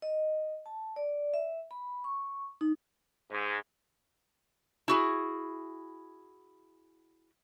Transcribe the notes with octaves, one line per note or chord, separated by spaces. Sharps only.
D#5
A5
D5
E5
B5
C#6
D#4
G#2
E4 F#4 G#4